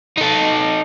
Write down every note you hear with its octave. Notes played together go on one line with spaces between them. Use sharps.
D#4 A4